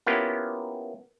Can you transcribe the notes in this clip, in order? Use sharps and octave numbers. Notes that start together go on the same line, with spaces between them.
A#3 B3 C#4 E4 F4 G4